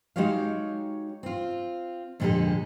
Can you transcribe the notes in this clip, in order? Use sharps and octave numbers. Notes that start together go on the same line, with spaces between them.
G#3 D#4 F#4 G4 C#5 F5
C4 F4
F2 A#2 D3 G#3 G4 A4